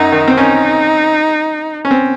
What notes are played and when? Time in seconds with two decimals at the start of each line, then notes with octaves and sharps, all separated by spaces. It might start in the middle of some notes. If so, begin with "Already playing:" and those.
Already playing: F#2 D#4
0.12 D#3
0.28 C4
0.37 C#4 D#4
1.85 C#4
1.91 C4